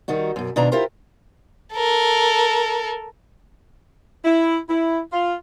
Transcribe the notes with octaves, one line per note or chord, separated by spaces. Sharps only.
D#3 G3 D#4 F#4
F#2 B2
B2 D#3 D4 F4 D5 A#5
E4 F4 G4 A#4 C5
A4 A#4
E4
E4
F4